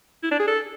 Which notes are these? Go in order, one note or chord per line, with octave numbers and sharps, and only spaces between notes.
E4
D4
G#4
A4